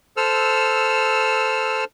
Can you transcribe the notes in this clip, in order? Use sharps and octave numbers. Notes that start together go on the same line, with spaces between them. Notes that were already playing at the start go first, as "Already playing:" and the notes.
A4 C5 E6 F6